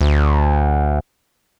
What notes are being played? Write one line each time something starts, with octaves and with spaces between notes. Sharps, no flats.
D2